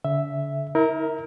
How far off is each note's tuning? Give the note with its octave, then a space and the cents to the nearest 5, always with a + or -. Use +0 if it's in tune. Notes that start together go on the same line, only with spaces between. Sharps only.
D3 -45 E5 +0
E4 -40 A#4 +0